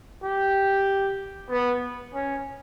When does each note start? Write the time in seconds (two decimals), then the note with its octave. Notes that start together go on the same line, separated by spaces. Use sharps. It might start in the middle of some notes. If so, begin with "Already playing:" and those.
0.24 G4
1.50 B3
2.14 C#4